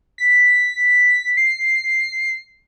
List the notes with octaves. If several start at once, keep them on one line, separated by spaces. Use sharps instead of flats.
B6
C7